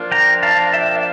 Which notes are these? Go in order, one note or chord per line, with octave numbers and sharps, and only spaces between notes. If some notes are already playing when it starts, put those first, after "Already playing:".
Already playing: F3 A#3 D4 F4
G5 A#5
F5 A5
E5 G5